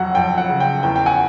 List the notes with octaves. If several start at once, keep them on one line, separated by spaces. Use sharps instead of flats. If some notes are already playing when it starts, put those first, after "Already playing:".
Already playing: F2 F#3 F#5
F2 G5
F#5
C#3
G5
E2 G5
G5
F#5 G#5